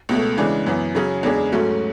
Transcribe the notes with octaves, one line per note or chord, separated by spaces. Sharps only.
C#2 B2 A3
C#3 E3 G#3 D4
F#2 E3 B3
C#3 F#3 C#4 G#4
E2 C#3 G#3 D4 G#4
G#2 F#3 A3 C#4 F#4